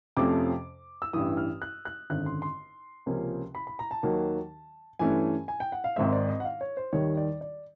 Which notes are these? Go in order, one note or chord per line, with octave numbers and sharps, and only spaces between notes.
F2 C3 F3 A3 C#4 D6
E6
A1 G2 E3 D#6
F6
F#6
F#6
G#1 F#2 D3 F#6
C6
C6
C#2 C3 F3 A#3 C#4
B5
B5
A#5
A5
D#2 D#3 F#3 A#3
G2 E3 A3 C#4 G#5
G#5
G5
F#5
F5
G#1 G#2 D#3 G#3 C4 E5
D5
D#5
F#5
F5
C#5
C5
D#2 D#3 G3 C#5
D5
D5